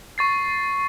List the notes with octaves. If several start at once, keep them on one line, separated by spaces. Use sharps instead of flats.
C#6 A6 C7